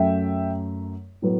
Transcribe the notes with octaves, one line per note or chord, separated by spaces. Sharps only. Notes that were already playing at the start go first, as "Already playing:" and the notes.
Already playing: F#2 F#3 A3 E5 G5
A2 F#3 B3